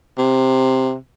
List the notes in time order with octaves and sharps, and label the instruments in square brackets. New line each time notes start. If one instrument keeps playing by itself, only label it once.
[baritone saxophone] C3